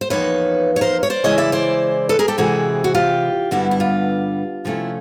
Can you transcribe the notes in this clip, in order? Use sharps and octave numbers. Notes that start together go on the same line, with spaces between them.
C5
E2 C3 F3 A#3 D#4 B4 C#5
C#5
A#4 C5
C#5
C5 D5
C#3 E3 G#3 C#4 E4 C#5 D#5
D5 E5
C5 D5
A4 B4
G#4 A#4
G4 A4
C3 E3 G#3 C4 E4 F#4 G#4
F#4
F4 G4
G2 D3 G3 B3 E4 F#4
E4
F4
C3 F3 A3 C#4 E4